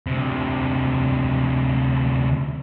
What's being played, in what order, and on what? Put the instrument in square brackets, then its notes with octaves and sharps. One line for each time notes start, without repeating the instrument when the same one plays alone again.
[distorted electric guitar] D2 C3